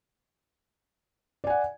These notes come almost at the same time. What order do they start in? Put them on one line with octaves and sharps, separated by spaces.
D5 G#5 F#5